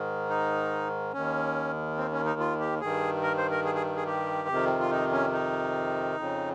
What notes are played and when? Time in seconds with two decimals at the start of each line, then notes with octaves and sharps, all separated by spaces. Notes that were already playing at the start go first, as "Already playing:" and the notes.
Already playing: G#2 D#3
0.30 D#4
1.13 D#2 D#3 C#4
1.97 C4
2.12 C#4
2.25 D#4
2.40 F4
2.60 G4
2.81 G2 D#3 G#4
3.23 A#4
3.37 C5
3.51 A#4
3.65 G#4
3.75 G#4
3.96 G#4
4.06 G4
4.48 F2 C3 D#3
4.79 F4
4.91 D#4
5.12 C#4
5.32 D#4
6.16 F2 C#3